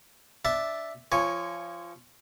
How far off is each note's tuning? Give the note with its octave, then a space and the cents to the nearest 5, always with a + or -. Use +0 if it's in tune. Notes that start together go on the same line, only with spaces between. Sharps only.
D4 +5 E5 +0 A5 +0
F3 -25 C#5 +0 G#5 -10